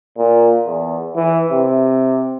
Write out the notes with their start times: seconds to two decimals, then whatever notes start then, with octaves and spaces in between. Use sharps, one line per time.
0.18 A#2
0.66 E2
1.16 E3
1.52 C3